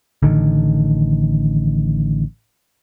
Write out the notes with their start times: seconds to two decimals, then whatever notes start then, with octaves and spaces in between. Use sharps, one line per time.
0.23 A1 D3 D#3